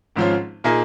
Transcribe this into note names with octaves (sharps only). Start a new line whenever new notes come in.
G#1 G#2 F3 C#4 F4
A#2 A#3 D#4 G#4